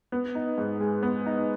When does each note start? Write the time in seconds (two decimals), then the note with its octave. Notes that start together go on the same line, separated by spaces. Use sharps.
0.12 B3
0.35 D#4
0.58 G#2
0.80 G#3
1.03 B3
1.26 D#4